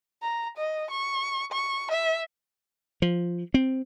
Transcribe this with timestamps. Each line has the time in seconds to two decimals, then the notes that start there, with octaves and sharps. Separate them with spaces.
0.22 A#5
0.57 D#5
0.91 C#6
1.52 C#6
1.91 E5
3.02 F3
3.54 C4